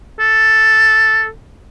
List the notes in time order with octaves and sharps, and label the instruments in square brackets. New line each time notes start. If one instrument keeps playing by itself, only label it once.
[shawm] A4